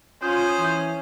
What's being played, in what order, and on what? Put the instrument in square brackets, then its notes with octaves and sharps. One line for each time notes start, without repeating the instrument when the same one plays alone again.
[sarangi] C#4 [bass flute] F4 [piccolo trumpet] C5 [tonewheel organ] D#6 G6
[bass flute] E3